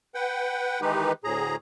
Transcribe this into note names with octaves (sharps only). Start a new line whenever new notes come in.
B4 F#5 G5
D#3 E3 G#3 D#4 G4 B4
D2 A2 G#4 A#5